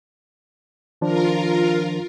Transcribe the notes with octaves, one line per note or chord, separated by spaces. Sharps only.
D#3 F3 D4 F4 A#4